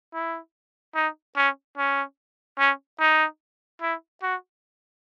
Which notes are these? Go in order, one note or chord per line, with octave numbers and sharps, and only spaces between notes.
E4
D#4
C#4
C#4
C#4
D#4
E4
F#4